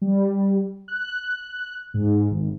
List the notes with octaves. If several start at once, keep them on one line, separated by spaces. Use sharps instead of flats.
G3
F#6
G#2
G#1